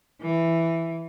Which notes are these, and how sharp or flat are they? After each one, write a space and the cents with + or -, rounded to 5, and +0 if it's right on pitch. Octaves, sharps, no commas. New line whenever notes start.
E3 +5